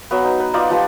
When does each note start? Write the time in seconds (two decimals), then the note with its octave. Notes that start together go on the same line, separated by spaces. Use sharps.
0.11 F#3 B3
0.25 D#4
0.40 B4
0.54 D#4 F4 D5
0.70 F3 G4 B4